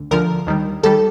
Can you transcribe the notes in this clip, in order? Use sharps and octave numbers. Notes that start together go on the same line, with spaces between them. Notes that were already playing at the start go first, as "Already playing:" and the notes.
Already playing: D2 D3
D2 D3 F3 A#4
D#2 D#3 G3
D#2 D#3 G3 A4